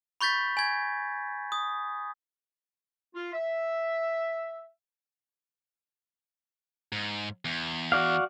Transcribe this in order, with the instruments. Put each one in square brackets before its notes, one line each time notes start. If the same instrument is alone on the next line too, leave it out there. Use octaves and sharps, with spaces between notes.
[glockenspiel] B5 C#6 G6 A6 B6
G#5 G#6
D#6
[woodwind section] F4
E5
[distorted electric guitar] G#2
E2
[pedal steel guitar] F#4 D5 F5